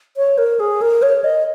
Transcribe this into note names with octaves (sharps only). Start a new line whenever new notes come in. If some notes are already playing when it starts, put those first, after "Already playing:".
C#5
A#4
G#4
A#4
C#5
D#5